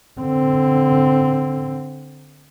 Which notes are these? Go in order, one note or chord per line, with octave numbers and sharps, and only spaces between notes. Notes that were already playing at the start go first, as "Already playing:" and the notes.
D3 C4